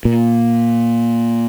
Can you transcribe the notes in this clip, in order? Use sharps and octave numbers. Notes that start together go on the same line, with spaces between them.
A#2